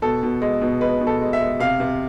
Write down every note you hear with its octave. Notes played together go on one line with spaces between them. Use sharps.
B2 A4
B2
G#3
B2
G#3 B4
B2
A4
G#3
E5
G#3
C3 F5
C3